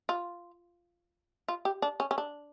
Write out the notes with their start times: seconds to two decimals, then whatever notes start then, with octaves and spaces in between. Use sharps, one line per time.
0.09 F4
1.48 F4
1.65 G4
1.82 D4
2.00 C#4
2.11 C#4
2.18 D4